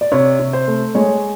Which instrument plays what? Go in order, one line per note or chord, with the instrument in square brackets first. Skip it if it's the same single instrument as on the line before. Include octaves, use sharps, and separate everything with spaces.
[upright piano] D5
C3 C#5
C3
C5
A3
G#3 C#5